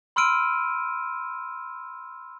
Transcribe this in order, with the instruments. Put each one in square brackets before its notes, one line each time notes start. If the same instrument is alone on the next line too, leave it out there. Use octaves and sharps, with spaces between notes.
[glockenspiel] B5 C6 E6 F6 D7 D#7